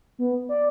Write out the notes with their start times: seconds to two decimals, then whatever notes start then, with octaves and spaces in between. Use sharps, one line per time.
0.19 B3
0.49 D5